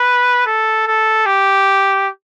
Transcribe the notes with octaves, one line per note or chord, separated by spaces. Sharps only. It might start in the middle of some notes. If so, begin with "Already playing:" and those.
Already playing: B4
A4
A4
G4